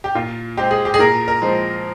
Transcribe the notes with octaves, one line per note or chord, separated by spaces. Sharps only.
G4
A#2 F4
G#3 C4 G4
G#4
G4
G#4
A#2 A#4
A#4
F3 G#3 C4